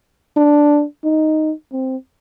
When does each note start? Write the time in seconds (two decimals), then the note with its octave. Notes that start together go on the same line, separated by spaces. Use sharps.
0.37 D4
1.04 D#4
1.72 C4